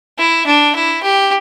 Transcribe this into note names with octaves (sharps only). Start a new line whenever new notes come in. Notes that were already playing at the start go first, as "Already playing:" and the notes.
E4
D4
E4
G4